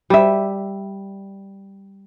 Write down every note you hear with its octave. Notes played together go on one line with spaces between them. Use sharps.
G3 E5